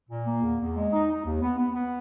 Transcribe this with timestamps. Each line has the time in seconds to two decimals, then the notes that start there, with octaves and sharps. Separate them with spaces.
0.09 A#2
0.27 A#3
0.42 E2
0.60 E2
0.77 G#3
0.93 D#4
1.09 D#4
1.26 D#2
1.42 B3
1.59 B3
1.76 B3